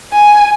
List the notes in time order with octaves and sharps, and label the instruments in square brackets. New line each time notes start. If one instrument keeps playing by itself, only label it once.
[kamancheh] G#5